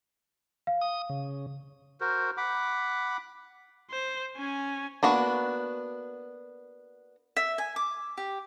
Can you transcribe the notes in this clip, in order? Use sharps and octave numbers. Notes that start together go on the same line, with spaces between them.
F5
D#6
C#3
F#4 A#4 C5
F#5 B5 D6
C5
C#4 G#5
A#3 B3 D4 F#4
E5
G#5
D6
G4